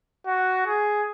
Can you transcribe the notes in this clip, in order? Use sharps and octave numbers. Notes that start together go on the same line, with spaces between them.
F#4
G#4